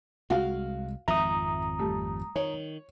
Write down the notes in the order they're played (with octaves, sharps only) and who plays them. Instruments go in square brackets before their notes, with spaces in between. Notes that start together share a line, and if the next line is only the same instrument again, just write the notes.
[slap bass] C2 G#3 [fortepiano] F#4 F5
[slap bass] G#1 F2 F3 [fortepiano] E5 [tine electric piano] A#5 D#6
[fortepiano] G3 A3
[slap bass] D#3 [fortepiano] C#5